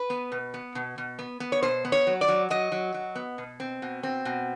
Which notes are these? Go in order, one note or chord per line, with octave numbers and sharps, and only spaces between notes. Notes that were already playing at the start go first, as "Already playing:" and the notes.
Already playing: B4
B3
B2
B3
B2
B2
B3
B3
C#5
B2 C5
B3
C#5
F#3
D5
F#3
F#3 D#5
F#3
F#3
B3
B2
C4
B2
C4
B2